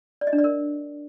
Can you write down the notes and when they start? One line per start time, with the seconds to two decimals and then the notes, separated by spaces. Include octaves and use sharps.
0.21 D5
0.27 D#5
0.33 D4
0.38 D5
0.44 A#4